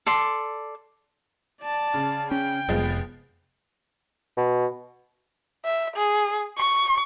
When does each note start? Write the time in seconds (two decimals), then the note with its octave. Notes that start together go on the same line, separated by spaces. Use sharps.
0.06 A4 D5 C6
1.62 D5 A5
1.94 C#3
2.31 C#4 G5
2.69 F1 F3 G#3 B3
4.37 B2
5.65 E5
5.96 G#4
6.58 C#6